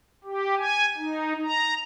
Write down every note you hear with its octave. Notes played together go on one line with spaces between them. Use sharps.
G4
G#5
D#4
A#5